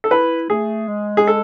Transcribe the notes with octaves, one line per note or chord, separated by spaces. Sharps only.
A4
E4 B4
A3 G#4
G#3
G#4
A4